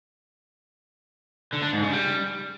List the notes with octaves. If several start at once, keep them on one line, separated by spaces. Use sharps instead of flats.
D3
D4
G#2
C#3
G3